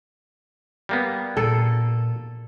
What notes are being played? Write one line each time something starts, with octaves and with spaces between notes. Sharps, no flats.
G3 A#3 B3
A#2 A4